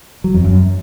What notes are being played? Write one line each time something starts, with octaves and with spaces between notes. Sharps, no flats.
F#3
F2
F#2